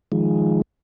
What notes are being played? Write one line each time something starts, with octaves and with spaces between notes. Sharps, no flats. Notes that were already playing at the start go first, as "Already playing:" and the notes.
D#3 F3 G#3